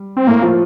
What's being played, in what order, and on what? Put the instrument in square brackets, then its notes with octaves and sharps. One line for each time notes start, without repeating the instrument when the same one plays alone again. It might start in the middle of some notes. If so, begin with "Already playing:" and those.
Already playing: [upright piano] G3
[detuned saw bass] C4
[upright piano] A2 A3 [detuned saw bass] A#3
[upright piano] F3 F4